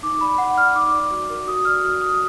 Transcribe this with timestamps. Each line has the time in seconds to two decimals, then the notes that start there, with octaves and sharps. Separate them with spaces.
0.03 D#4 D6
0.21 D5 B5
0.38 D#4 F#5
0.57 D5 F6
0.75 D#4 D6
0.93 D5
1.11 F#4
1.30 A#4
1.47 F#4 D#6
1.65 D5 F6
1.83 F#4 F6
2.02 F#4 D#6